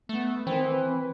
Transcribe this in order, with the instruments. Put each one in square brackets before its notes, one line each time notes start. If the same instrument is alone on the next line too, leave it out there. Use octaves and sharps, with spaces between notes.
[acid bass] A3 [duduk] B3
[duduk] D#3 [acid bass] E3 [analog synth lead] C4
[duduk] B4